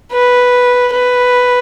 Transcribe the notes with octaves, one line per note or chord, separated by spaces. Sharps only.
B4
B4